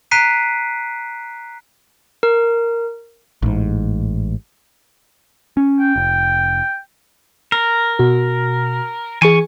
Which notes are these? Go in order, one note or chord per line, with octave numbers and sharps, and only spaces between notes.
A#5 F#6 B6 C7 D7 D#7
A#4
A1 G#2
C#4
G5
F1
A#4
B2 F#4
E3 G#4 G#5 C#6